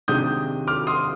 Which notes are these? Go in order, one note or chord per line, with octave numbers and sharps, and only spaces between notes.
C3 D#3 G#3 D4 D#6 G6
D6 F6
C6 D#6